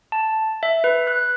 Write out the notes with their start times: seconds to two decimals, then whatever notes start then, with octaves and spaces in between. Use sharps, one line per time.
0.12 A5
0.63 E5
0.84 B4
1.07 F#6